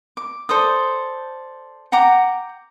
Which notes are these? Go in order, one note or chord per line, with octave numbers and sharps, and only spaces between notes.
D6
A4 C5 D5 D#6
F#5 G5 A#5 D6